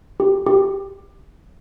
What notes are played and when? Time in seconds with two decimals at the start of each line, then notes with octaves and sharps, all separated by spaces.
0.20 G4
0.46 G4